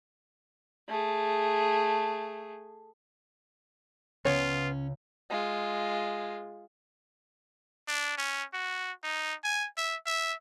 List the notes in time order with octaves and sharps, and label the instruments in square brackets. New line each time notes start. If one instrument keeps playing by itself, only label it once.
[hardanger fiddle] A3 G#4
[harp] C#2 [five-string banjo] B3 C#5 [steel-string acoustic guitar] C#4 [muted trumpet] F4
[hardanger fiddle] G#3 F4
[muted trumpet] D4
C#4
F#4
D#4
G#5
E5
E5